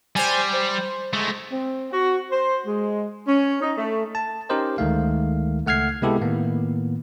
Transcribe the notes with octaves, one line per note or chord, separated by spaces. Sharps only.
G3 C5 G#5
C5
G#3 A3
C4
F#4
C5
G#3
C#4
D#4
A3
A5
C#4 D#4 G4 A#4 C5 D#5
D2 D#3 G#3 A3 F5
C#2 A3 F#5 F6 G#6 C7
C3 G#3 B3 E4 G4 A4
A2 D#3 A#3 B3